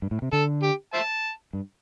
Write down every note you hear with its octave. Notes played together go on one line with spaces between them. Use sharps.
G2
A2
C3
D3 A4
G4
C5 E5 A5
G2